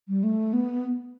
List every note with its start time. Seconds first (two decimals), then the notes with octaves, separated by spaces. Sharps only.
0.08 G3
0.24 A3
0.53 B3